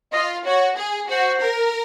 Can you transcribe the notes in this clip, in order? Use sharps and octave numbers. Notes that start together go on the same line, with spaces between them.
F4 D#5
F#4 C#5
G#4
F#4 C5
A#4